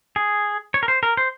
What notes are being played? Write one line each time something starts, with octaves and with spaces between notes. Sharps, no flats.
G#4
C#5
A#4
C5
A#4
C5